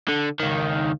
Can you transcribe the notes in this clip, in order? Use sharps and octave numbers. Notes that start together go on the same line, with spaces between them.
D3
C#2 D#3